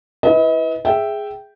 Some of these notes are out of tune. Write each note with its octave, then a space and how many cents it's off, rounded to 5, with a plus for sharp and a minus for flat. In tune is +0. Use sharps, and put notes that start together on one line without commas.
E4 +0 B4 +0 D#5 +40
G#4 +0 E5 +0 G5 -5